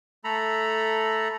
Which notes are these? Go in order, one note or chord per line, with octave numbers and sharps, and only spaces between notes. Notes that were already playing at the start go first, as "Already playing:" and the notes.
A3 A4 A#5 B5